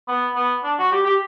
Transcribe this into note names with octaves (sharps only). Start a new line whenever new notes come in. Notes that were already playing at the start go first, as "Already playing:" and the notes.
B3
B3
D4
F#4
G4
G4